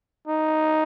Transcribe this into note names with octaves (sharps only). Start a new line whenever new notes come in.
D#4